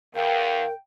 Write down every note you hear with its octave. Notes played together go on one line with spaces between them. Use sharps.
E2 A#4 F5 G5